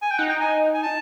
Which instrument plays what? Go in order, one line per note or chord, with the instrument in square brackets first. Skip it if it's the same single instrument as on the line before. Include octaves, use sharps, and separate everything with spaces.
[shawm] G#5
G5
[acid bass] D#4 [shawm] F#5
[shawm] G5
G#5
G#5
A5